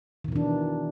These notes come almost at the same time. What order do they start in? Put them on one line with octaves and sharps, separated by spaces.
D#3 B2 E3 D4